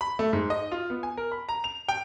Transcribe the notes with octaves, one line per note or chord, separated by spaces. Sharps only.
B5
A3
G#2
D#5
F4
B3
G#5
A#4
B5
A#5
F7
G5